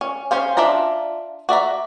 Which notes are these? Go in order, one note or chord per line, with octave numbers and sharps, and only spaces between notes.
C#4
C#4 C5 F5
D4 F4 E5 A#5
F#4 D5 E5 A#5